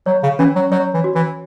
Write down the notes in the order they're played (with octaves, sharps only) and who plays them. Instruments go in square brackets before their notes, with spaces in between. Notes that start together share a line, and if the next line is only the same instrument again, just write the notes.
[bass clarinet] F#3 [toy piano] C#5
[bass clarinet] C#3
[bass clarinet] E3 [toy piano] C#4
[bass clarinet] F#3
[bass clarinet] F#3 [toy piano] C#5
[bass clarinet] E3
[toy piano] F#4
[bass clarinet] E3